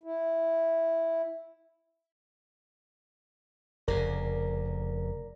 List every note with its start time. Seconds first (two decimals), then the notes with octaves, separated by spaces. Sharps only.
0.04 E4
3.88 F1 C#3 A#4 D5 A#5